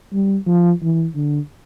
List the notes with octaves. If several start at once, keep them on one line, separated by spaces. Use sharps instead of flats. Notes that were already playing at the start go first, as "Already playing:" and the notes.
G3
F3
E3
D3